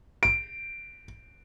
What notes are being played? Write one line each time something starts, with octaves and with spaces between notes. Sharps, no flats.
D7